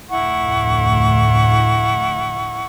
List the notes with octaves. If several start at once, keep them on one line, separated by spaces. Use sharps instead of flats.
F1 D2 A2 E4 F#5 C#6